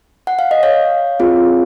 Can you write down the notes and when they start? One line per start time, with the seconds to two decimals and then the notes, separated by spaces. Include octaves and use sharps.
0.27 F#5
0.39 F5
0.51 D#5
0.63 C#5 F5
1.20 C4 F4 G#4